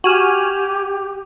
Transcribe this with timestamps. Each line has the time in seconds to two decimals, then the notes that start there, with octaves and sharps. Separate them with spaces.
0.04 F#4 G4 G#5 F6